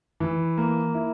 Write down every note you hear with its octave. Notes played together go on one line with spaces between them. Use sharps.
E3
A#3
E4